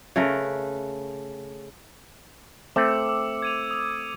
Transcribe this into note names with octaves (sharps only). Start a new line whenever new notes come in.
C#3 A3 A#4 B4
A3 C4 D6 E6 C#7
E6
G#6 D#7 F7
D#6 F7